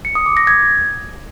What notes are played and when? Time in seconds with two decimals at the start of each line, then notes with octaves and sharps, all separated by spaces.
0.05 C#7
0.15 D#6
0.26 D6
0.37 A#6
0.47 G#6